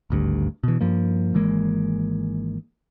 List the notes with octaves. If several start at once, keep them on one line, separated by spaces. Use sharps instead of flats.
G#1 D2 G2
B2 E3
G2 F3 A#3
G#1 E3 G#3 A#3